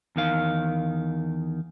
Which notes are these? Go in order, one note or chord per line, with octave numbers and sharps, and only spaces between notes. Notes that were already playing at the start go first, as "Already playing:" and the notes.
E2 D#3 F5